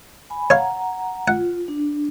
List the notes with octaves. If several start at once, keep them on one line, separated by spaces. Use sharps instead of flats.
G#5 B5
C#5 F5 F#5 A#5
F4 F#5
D4